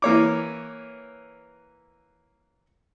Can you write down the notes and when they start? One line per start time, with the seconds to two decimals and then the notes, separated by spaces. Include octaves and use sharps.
0.02 E3 A#3 C#5 D6